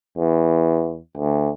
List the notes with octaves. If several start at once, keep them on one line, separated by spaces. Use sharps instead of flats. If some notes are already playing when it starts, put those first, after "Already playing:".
E2
D2